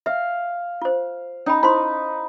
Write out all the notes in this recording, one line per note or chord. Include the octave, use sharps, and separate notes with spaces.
E5 F5
F4 C5
C#4 D#4 G5 B5
E4 C5 B5 C6